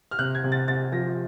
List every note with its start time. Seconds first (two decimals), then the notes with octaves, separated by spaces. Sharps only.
0.11 F6
0.19 C3 F#6
0.35 G#6
0.44 C3
0.52 A6
0.68 C3 A6
0.92 F3 A#6